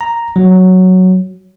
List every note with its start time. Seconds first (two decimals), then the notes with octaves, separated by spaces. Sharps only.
0.01 A#5
0.36 F#3